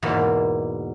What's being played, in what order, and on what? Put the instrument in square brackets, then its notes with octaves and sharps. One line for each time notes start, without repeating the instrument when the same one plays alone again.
[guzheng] E2 G#2 B2 A#3